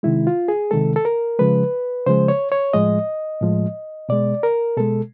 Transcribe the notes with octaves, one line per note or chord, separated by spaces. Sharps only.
C3 D#3 G#3 E4
F4
G#4
C3 D#3 G#3 A4
A4
A#4
C#3 F3 G#3 B4
C#3 F3 G#3 C5
C#5
C#5
A2 F3 G#3 D#5
A2 F3 G#3
B2 G#3 D5
A#4
B2 G#3 A4